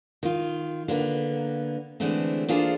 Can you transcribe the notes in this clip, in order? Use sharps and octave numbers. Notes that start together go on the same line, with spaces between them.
D#3 F4
D3 A#3 B3
D3 E3 G#3 A3 B3 C4
A#3 D4 F4 G#4 A4 C5